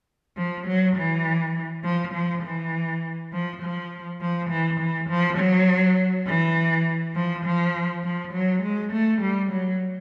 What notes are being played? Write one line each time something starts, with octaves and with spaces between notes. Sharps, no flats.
F3
F#3
E3
F3
F3
E3
F3
F3
F3
E3
E3
F3
F#3
E3
F3
F3
F3
F#3
G#3
A3
G3
F#3